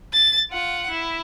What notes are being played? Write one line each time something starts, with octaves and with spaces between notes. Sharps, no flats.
A6
F4 F#5
E4